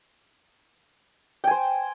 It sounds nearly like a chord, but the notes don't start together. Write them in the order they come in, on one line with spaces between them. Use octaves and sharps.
G5 G#5 C5